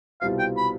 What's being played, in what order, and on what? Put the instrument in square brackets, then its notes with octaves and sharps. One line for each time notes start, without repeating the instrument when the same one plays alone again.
[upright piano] C2 B2 G3 C4 F4 [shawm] F5
[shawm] G5
B5